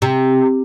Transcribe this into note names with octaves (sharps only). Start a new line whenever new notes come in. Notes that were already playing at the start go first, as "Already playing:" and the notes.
C3